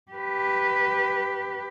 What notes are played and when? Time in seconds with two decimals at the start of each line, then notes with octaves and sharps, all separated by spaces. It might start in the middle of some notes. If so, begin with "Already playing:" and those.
0.12 G4 B4